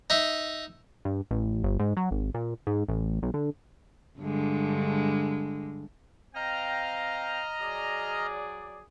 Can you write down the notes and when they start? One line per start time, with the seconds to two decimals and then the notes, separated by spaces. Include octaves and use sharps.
0.10 D#4 E5
1.05 G2
1.31 A1
1.64 G1
1.80 G#2
1.97 F#3
2.11 G#1
2.34 A#2
2.67 G#2
2.88 A1
3.22 B1
3.34 D3
4.19 G2 D3 G#3
6.35 C4 D#5 F5 G5 A#5 F6
7.60 F#3 G#4 D5